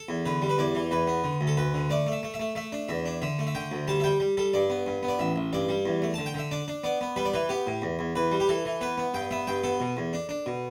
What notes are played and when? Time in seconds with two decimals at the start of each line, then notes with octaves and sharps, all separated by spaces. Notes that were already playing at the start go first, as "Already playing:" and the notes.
Already playing: A4
0.09 E2
0.26 D3 B4
0.42 G3
0.49 B4
0.58 E2 D5
0.75 E3
0.91 E2 B4
1.07 B3
1.24 D3
1.41 D2
1.47 A4
1.57 D2 B4
1.74 D3
1.90 A3 D5
2.06 A3
2.12 E5
2.23 A3
2.34 E5
2.39 A3
2.55 A3 E5
2.72 D4
2.89 E2 E5
3.06 D4
3.22 D3 E5
3.39 A3
3.47 E5
3.55 D3 G5
3.72 D2
3.88 G3 A5
4.00 E5
4.04 G3 G5
4.20 G3
4.37 G3 A4
4.53 G2 D5
4.70 B3
4.86 G2
5.03 B3
5.08 D5
5.19 A1 E5
5.36 A1
5.53 G2 D5
5.69 G3
5.85 E2
6.02 A3
6.14 D3 A5
6.26 G5
6.34 D3 E5
6.51 D4 D5
6.68 D4
6.84 B3 D5
7.01 B3
7.16 G3 B4
7.25 D5
7.34 E3 B4
7.49 B3 G4
7.67 A2
7.82 E2
7.99 E2
8.16 E2 B4
8.31 G3
8.40 G4
8.49 E3 A4
8.65 E3
8.81 B3 B4
8.98 B3
9.14 G2 G5
9.31 B3 E5
9.47 G2 G5
9.63 B3 A4
9.80 B2
9.97 E2
10.13 D4
10.29 D4
10.46 B2